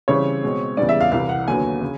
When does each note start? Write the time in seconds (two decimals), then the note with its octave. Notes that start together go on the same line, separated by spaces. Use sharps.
0.08 C#3 E3 G3 C4 E4 C#5
0.43 B2 G#3 C4
0.77 E2 C#3 E3 G3 D5
0.89 E5
1.01 F5
1.12 C2 C3 E3 F5
1.29 F#5
1.48 D#2 D3 F#3 B3 G#5
1.82 C#3